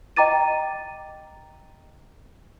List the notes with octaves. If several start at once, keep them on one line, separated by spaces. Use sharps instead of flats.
D#5 G5 A#5 D6 A6 D#7